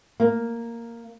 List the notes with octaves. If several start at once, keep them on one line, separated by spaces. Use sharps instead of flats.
A#3